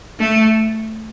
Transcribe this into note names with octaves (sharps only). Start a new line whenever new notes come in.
A3